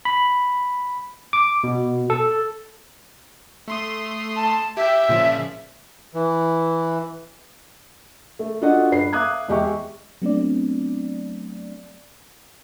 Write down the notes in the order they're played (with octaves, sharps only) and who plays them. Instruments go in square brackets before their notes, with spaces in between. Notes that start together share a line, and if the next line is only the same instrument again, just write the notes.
[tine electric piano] B5
D6
B2
A4
[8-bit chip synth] A3 C6 D#6
[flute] A5
[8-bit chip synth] G4 G5 [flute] E5
[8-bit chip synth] A#2 C#3 F3
[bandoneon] E3
[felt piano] A3
D4 F4 F#4 A4 D#5 F#5
G2 B4 C7
E5 F5 D6 D#6 F#6 G#6
E2 G#3 G4 E5 C#6
[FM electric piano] F#3 A3 B3 C4 D4 D5